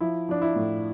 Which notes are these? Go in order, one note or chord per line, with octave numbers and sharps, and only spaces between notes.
F3 E4
F3 D4
E4
A2